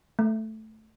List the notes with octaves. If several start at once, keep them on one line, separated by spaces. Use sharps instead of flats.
A3